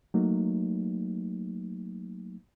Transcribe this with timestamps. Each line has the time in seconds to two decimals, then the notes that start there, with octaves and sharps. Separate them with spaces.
0.14 F#3 A3 A#3 D#4